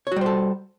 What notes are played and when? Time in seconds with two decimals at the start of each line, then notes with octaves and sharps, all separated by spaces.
0.07 C#5
0.12 F#4
0.16 G3
0.21 C5
0.26 A4